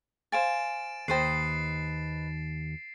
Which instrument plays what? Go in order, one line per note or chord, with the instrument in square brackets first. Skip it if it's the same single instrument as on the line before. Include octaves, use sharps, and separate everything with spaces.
[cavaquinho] C5 F5 G#5 [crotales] A6 D7 E7
[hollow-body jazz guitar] D#2 G5 [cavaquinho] B4 C5 D#5 [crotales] A6 C7